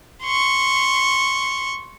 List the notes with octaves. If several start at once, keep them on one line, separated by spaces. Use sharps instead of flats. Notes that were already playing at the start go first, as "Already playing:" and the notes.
C6 C#6